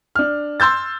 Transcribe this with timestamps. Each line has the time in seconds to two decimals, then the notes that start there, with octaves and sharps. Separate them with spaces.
0.15 D4 F6
0.60 C6 E6 G6 A6